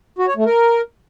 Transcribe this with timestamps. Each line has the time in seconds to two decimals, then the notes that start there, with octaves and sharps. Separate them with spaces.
0.19 F#4
0.28 C#5
0.37 A3
0.46 A#4